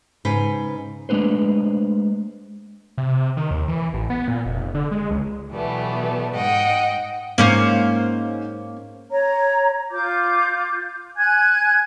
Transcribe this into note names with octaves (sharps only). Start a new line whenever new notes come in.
G#2 C#3 B4 C5
G#3 A3 D4 B4 C5
C3
D#3
D#2
E3
A1
B3
A#2
F1
D3
G#3
C#2
B2 E3 F#3 G3 A3 B3
G#2 G#3 D#5 F#5 G5
G#2 A#3 C#4 C5
C#5 A#5
F4 D6 G6
G#5 F#6 G#6